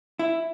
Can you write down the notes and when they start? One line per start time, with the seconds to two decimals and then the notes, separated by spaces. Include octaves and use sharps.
0.19 E4